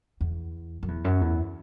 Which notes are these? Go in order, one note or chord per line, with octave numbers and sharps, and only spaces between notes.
E2
F#2
E2
F#2
E2